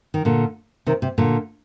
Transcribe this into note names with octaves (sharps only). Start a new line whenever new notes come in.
D#3
A#2 D3
C3 D#3
C3
A#2 D3